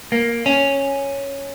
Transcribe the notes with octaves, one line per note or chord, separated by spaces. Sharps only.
A#3
C#4